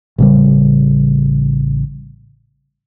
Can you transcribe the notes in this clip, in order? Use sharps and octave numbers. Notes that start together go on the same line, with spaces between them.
A1 C#3 G3